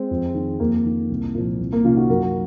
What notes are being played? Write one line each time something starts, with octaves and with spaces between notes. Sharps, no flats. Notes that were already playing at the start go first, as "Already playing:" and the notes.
Already playing: G#3 C4
F2
D#3
F2 A#3
D#3
C2
A#2 F3
C2
A#3
C3 D#3 C#4 F4
D#4 F#4
F#2 F#4 A#4